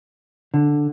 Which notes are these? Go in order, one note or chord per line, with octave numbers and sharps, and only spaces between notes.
D3